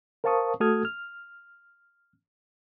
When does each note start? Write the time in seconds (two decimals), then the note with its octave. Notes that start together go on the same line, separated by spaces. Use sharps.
0.24 A#4 C5 F5 A5 C#6 D#6
0.60 A3 F#4 A4 D#6 F6 G#6
0.85 F6